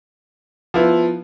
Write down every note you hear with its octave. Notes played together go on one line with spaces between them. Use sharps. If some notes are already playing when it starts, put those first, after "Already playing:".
F3 B3 E4